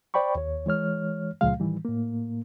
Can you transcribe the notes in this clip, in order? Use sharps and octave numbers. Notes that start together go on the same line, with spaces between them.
C5 D5 G5 B5 C#6
D#2 C#5
E3 G#3 C#5 F6
C#2 A#2 C#3 F3 G#3 F5
A2 D#3 E3 G3
A2 A#3